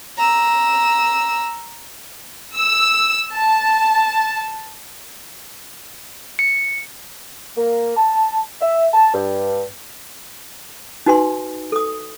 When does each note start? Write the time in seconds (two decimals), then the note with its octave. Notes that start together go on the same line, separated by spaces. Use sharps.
0.17 A#5 E6
2.54 E6
3.32 A5
6.39 C#7
7.57 A#3
7.97 A5
8.62 E5
8.94 A5
9.14 G2
11.06 D#4 F#4 B4 G#5 C6
11.72 A4 D#6